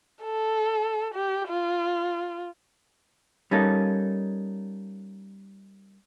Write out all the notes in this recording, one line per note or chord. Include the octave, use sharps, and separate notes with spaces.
A4
G4
F4
G3 A#3 C#4 D#4 A4